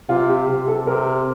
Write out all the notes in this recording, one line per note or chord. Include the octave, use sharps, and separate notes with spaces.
C3 F4
G4
C3 G4
A4
C3 A#4